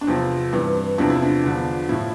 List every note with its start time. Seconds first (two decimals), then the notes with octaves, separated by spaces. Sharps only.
0.01 D4
0.07 E2 C3 F3 C4
0.53 G2 E3
0.98 E2 C3 F3 D4
1.10 E4
1.23 D4
1.43 E2 D3 F3
1.89 A2 F3 E4